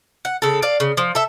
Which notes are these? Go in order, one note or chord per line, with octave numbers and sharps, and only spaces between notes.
F#5
C#3 A4
D5 F5
C#3
F3
A4 E5